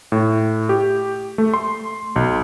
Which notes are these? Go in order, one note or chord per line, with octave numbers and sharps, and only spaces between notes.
A2
G4
A3
C6
B1